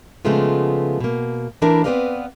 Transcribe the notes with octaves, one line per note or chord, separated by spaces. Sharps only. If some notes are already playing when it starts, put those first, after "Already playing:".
C#3 F3 G#3 A3 B3 F4
B2 A#3
E3 A3 D4 E4 A#4
B3 C4 B4 D5 D#5 F5